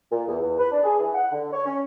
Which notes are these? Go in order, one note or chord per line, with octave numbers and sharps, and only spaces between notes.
A#2
E2
E2
B4
D4
G#4
E3
F#5
D3
C#5
C#4